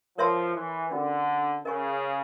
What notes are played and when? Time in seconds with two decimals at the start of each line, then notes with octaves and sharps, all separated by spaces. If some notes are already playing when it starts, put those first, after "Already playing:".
0.18 F3 A#4 C#5 E5 A5 C6
0.54 E3
0.91 D3 C#4 F#4 A#4 D#5 G5
1.64 C#3 A#4 D#5 G#5 C#6